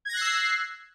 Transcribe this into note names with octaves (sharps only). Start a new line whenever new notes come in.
E6 F#6 G#6 A#6 C7